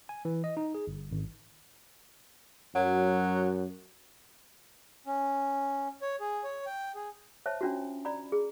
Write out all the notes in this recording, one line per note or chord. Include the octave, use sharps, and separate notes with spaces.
G#5
E3
D#5
D#4
G#4
G1
G#1
F#2 F#3
C#4
C#5
G#4
C#5
G5
G#4
C5 C#5 E5 A5
C#4 D4 F4 F#4
D5 A#5 B5
G#4